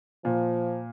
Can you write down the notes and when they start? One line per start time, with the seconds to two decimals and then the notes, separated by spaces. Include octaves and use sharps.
0.25 A#2 F3